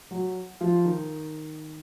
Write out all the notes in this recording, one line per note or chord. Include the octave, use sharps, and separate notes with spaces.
F#3 F#4
F3 F4
D#3 D#4